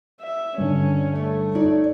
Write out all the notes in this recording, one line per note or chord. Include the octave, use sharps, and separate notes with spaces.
E5
G2 D3 C#4
A3 C#5
D#4 C#5 D5